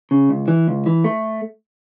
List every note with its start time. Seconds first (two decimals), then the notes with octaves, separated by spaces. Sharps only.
0.11 C#3
0.29 C#2
0.48 E3
0.68 C#2
0.86 E3
1.04 A3